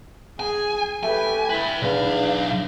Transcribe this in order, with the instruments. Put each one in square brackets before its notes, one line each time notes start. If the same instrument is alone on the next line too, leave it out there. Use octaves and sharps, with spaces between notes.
[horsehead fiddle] G#4 [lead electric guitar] G#5
[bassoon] A3 [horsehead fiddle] G4 B4 [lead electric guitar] G#5
[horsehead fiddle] E4 [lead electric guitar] B4 G5
[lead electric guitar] B1 F5 [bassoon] E2 [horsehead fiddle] D4 D#4